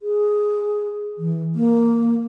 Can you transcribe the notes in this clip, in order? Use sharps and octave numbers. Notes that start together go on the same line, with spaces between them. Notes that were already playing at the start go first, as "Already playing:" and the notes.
G#4
E3
A#3